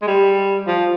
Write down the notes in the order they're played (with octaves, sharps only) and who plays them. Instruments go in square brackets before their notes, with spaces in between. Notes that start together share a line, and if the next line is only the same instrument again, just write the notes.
[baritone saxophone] G#3
G3
F3